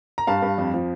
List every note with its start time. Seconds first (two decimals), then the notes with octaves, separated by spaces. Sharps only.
0.18 A#5
0.27 G2 F5 A5
0.42 G2
0.58 F2
0.74 F3